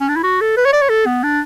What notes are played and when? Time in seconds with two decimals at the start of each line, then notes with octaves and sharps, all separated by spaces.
0.01 C#4
0.09 D4
0.16 E4
0.23 F#4
0.41 A4
0.57 B4
0.65 C#5
0.73 D5
0.82 C#5
0.89 A4
1.06 B3
1.23 D4